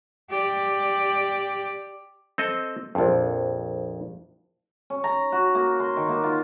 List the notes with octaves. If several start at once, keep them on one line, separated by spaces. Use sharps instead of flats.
G4 D5
C4 A4 D#5
A#1 F2
C#4
A#5
F#4
A#3
C6
D#3
A#3
F4